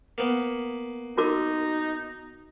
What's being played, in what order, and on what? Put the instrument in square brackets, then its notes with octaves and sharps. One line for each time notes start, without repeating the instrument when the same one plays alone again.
[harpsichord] A#3 B3
[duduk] D#4 [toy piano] F#4 A#4 D6